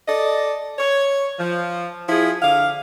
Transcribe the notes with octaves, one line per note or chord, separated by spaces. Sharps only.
A4 D5 D#5
C#5
F3
F3 E4 G#4
D3 F5